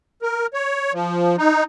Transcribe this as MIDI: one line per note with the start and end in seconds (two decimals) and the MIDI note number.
0.22 0.47 70
0.54 0.92 73
0.93 1.36 53
1.38 1.64 63